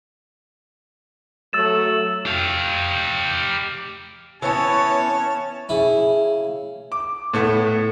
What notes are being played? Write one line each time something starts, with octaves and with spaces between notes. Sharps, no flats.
F#3 A3 E6 A6 E7
G4 F5
E3 B3 C#4 C#5 A5
C#3 E4
D6
A2 A3 B3